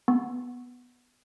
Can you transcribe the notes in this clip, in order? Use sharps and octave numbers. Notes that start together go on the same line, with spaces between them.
B3